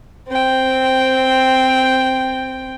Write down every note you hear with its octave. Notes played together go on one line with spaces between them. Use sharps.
C4 G5